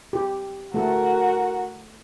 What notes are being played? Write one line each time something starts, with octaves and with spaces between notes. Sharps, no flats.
G4
A3 F#4 A4 A#4